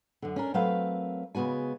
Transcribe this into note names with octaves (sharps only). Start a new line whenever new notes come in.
F#2 D3
C#4 D4 A#4
F#3 A3 C4 A#4 B4 F5
C#3 G#3 B3 F#4 G#5